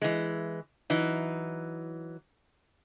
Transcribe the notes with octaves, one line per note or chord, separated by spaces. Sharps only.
E3 G#3
E3 F#3 D#4